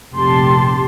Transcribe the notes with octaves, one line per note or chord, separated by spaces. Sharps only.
F1 A#1 C3 G4 A5 C6